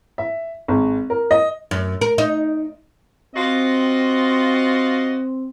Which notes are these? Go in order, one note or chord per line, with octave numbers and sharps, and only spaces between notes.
E5
G#1
A#4
D#5
F#2
A#4
D#4
C4 F4 F#4 D#5